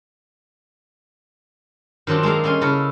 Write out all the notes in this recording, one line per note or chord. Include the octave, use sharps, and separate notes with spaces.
D#3 F#3 C4 D4 F4
G#3 A#3 A4 A#4 F5
G3 A#3 C#4 G#5 C6
C#3 E4 A4 A#4 D#5